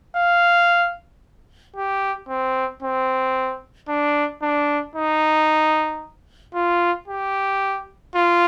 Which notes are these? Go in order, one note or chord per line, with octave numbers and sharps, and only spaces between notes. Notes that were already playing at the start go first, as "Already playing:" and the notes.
F5
G4
C4
C4
D4
D4
D#4
F4
G4
F4